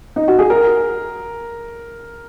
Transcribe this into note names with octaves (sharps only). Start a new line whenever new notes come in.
D#4
F#4
G#4
A#4